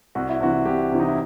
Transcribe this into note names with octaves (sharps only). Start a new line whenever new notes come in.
C2 F#4
E4
C3 E3 F#4
C2 G4
C3 E3
D#4
E4